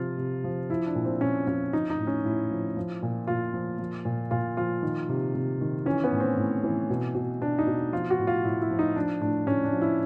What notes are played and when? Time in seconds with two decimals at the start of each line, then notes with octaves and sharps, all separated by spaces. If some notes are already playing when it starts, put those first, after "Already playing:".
Already playing: C3 F3 F4
0.18 C3
0.44 F3
0.69 F3 E4
0.86 D4
0.95 A#2
1.05 C4
1.21 A#2 C#4
1.47 F3 C#4
1.73 F3 D#4
1.90 D#4
1.99 A2
2.07 C#4
2.25 A2 E4
2.51 F3
2.77 F3
3.03 A#2
3.27 A#2 F4
3.54 F3
3.79 F3
4.05 A#2
4.31 A#2 F4
4.57 F3 F4
4.83 D#3
5.09 C3
5.35 C3
5.61 D#3
5.86 E3 C#4
6.04 B3
6.12 A2
6.20 C4
6.37 A2
6.64 E3
6.90 B2
7.15 B2
7.41 B2 D4
7.59 D#4
7.67 B2
7.92 F3 F4
8.10 F#4
8.19 A2
8.27 F4
8.44 A2 E4
8.62 E4
8.71 F3
8.79 D#4
8.96 F3 D4
9.21 A2 D4
9.47 A2 C#4
9.64 D4
9.73 F3
9.82 E4